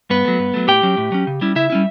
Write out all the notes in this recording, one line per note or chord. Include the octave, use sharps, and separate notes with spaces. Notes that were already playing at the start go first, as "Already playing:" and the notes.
G2 B3 B4
F#3 A3
G2
F#3 A3
A2 G4 G5
F#3 C#4
A2
F#3 C#4
C#3
G3 C#4 E4
C#3 E4 E5
G3 C#4 E4